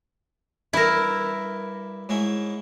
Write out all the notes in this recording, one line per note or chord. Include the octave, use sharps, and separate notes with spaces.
G2 E4 A#4 A5
G#2 C#4 E4